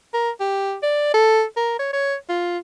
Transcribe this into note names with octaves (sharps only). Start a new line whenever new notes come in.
A#4
G4
D5
A4
A#4
C#5
C#5
F4